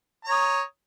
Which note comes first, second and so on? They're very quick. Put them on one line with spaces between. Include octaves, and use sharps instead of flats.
A#5 C#5 D#6